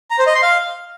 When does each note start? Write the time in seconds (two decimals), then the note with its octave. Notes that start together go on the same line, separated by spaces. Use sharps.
0.11 A#5
0.19 C5
0.27 D#5
0.35 C6
0.43 F5